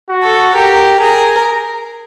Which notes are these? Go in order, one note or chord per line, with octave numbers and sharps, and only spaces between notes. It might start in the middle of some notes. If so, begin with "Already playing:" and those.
F#4
A4
G4 A#4
G#4 A#4